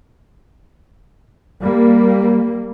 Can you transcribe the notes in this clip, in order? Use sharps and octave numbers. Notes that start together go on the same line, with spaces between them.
G3 A#3